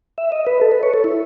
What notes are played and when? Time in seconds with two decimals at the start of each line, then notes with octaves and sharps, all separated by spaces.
0.18 E5
0.32 D#5
0.47 B4
0.61 A4
0.72 B4
0.83 C#5
0.94 A4
1.04 E4